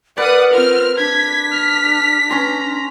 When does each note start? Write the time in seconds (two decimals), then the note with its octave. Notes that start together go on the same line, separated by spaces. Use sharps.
0.18 A#4 B4 D5 F#5 D#6
0.53 C4 F4 A#4 F6
0.98 D4 G#6 B6
1.52 F6
2.30 C#4 A#5 C6